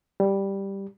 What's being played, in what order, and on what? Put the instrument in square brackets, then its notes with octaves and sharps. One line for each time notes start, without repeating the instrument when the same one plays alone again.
[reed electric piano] G3